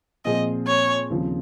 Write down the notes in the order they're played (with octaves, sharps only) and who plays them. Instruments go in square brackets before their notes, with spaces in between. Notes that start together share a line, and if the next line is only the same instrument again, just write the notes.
[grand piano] A#2 F3 C4 F4 G#4 [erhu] D#5
[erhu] C#5
[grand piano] D#2 C#3 F3 C4